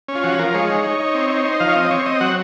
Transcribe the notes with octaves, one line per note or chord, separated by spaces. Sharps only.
C#4
F4
F3 F#4
F3 A#4
G#3 C#5
D#4
D#4
D#4
C4
D#4
D#4 C5
F3 F5
C#5
C4 D#5
C4 C#5
C4 D#5
F#3 F#5